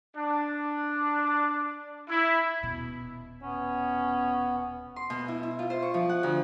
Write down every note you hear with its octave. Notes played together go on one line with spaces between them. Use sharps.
D4
E4
D#1 B2
B3 C#4
C6
B2
E4
E4
F4
C5
C#6
F3
F#5
D2